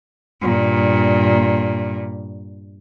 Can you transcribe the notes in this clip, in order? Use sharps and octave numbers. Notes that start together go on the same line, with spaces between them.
G2 A#2